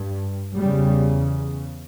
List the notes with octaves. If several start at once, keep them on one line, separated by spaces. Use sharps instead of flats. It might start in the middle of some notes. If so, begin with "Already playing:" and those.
Already playing: G2
E2 C#3 G3